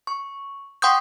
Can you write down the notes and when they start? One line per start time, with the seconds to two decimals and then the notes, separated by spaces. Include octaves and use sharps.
0.07 C#6
0.82 F#5 G5 C6 C#6 D#6 G6